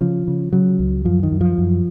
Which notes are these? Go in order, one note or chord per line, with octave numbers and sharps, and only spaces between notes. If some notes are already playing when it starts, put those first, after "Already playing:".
C#3 F3
C#3
C#3 F#3
C#2
F#2 F3
D#3
F#2
F3
F#2